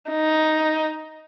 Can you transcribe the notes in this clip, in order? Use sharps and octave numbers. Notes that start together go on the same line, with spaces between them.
D#4